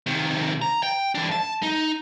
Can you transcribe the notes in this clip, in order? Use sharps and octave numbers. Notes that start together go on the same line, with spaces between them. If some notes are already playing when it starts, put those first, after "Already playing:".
C3 D#3
A#5
G5
E3 D4
A5
D#4